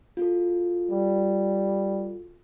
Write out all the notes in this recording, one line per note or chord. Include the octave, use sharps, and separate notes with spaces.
F4 F#4 A4
G3